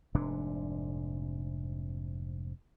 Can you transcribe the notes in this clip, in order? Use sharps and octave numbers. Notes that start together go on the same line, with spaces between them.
F1 G#2 C3 D4